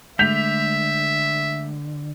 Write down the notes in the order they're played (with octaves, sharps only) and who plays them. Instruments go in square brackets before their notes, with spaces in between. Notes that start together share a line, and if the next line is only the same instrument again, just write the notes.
[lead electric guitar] D3 [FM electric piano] G#3 A3 [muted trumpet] E5 [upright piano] G6 B6 F7